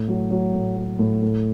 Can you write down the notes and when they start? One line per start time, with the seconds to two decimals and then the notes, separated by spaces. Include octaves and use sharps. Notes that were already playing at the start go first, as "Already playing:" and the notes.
Already playing: A2
0.08 F#3
0.31 F#3
0.54 A2
0.76 F#3
0.99 A2
1.22 A2